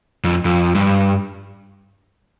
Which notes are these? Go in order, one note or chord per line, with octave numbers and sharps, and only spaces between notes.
F2
F2
G2